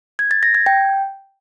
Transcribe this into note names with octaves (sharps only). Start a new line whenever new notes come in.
G#6
A6
A#6
G#6
G5